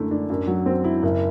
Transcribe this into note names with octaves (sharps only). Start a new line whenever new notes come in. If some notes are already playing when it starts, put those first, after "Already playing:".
Already playing: F#2 D3 A3 E4
D4
F#2
F#3
C4
E4
F#1